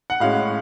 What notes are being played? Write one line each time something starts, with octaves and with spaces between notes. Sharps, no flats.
F#5
A2 G#3 C#4 F5